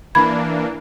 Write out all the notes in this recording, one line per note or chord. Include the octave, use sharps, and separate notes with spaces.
E3 A#3 D4 B5 G#6